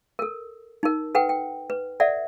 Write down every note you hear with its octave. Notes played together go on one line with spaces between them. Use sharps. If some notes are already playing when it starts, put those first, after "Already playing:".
A4 A#4
D#4 A#4
A4 B4 F#5 G5
G5
B4
A4 D5 E5 F#5